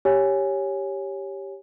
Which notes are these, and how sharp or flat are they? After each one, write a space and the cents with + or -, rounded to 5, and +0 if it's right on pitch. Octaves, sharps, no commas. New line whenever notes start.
G4 +0 C#5 +0 G#5 +0